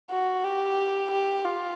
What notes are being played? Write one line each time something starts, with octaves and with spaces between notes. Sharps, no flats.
F#4
G4
G4
F4